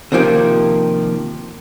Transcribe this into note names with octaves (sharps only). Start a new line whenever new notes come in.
C3 D#3 F3 A#3 G4